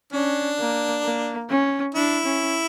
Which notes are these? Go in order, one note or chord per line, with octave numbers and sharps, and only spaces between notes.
C#4 D4
A#3
A#3
C#4
D4 E4
C#4